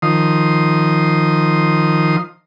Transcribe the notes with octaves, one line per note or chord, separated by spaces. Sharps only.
D#3 F3 C6 D#6